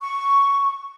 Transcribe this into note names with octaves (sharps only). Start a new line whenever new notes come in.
C#6